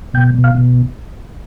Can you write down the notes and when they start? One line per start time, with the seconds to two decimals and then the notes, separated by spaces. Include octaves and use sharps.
0.14 B2 G5
0.35 B2
0.44 F5
0.55 B2